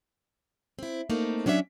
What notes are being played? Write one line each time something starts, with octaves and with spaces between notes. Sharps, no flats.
C4 E4
A3 A#3 C4 D#4
F#3 C#4 D4 C5 E5